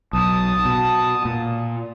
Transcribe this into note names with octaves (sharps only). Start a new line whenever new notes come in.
B1 A5 D#6
B2
A#2